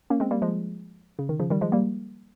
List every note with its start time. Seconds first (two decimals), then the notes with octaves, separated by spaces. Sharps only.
0.10 A#3 C#4
0.20 G#3 C4
0.31 G3 A#3
0.42 F3 G#3
1.19 C#3
1.29 D#3
1.40 C#3 F3
1.50 D#3 G3
1.61 F3 G#3
1.72 G3 A#3